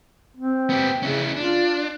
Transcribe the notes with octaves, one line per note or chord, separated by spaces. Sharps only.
C4
B3 G4
C#3 C#4 E4
D4 F4